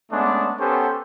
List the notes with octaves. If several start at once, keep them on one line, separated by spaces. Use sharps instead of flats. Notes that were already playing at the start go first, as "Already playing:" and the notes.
G#3 A3 B3 C#4 D4
B3 C#4 G4 A4 C5